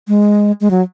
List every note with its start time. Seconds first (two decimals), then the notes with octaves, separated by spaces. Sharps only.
0.08 G#3
0.61 G#3
0.71 F#3